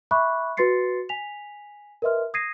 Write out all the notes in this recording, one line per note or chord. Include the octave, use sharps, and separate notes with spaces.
E5 B5 C#6 D6 F#6
F#4 B4 C6 A6 C7 C#7
G#5 B6 F7
A#4 B4 D#5 E5 C6 F6
D#6 G#6 A#6 C7 D#7